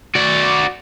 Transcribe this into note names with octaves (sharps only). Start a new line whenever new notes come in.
F#4 D5